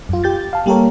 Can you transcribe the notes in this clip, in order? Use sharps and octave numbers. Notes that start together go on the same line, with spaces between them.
F#2 F4
G4 G6 A6
F5 A5
G3 A#3 G4 A4 A#4 C#5